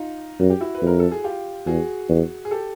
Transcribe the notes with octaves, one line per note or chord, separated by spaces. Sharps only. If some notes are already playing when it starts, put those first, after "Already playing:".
Already playing: D#4 F4
F#2 F#4
G4
E4 F#4
B4
F2
A#4
A4
G#4
F4 G4
E2 F#4 G#4
E2
G#4
G4 A4